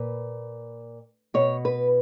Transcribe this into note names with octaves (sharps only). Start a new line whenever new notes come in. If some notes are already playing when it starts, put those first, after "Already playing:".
Already playing: A#2 B4
B2 C#5
B4